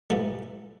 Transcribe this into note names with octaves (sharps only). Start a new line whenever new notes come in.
G#2 E3 G3 A3